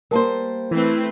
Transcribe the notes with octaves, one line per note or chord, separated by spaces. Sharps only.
G3 A#3 A#4 C5 A5
E3 A3 C4 B4